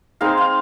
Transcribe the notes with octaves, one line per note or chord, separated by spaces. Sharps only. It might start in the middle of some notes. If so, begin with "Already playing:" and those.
G#3 C4 D#4 F5
F5